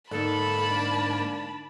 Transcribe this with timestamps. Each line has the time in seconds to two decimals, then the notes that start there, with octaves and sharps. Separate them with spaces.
0.11 G#2 D3 A#3 D#4 A4 A5 B5
0.69 D4